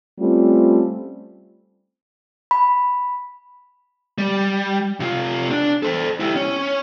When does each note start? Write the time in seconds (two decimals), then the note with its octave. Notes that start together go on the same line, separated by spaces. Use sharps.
0.19 G3 A3 C4 C#4 F4
2.51 B5
4.18 G3
5.00 C3 F4
5.51 D4
5.83 A4 C5
6.20 E4 G4
6.36 C#4